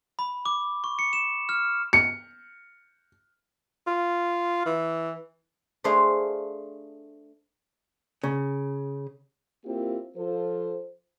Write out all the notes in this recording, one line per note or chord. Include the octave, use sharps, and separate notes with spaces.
B5
D6
C#6
C#7
E7
F6
C#7
F4
E3
A3 D4 G#4 C5 F5
C#3
A#3 C4 E4 F4 G4 A#4
F3 F4 A4 C5